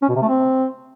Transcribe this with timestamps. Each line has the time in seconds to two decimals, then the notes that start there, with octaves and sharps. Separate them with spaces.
0.02 C#4
0.09 B2
0.15 C3
0.22 A3
0.28 C4